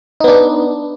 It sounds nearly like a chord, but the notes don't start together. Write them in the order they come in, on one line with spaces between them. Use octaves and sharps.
D#4 B3 D4